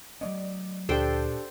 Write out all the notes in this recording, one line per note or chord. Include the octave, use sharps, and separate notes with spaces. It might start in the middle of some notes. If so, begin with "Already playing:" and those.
F#3 A3 C#4 D5 D#5
D2 A#2 D4 G4 A4 C5 G5